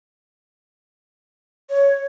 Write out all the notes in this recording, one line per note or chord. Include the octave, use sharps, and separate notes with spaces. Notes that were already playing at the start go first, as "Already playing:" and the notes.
C#5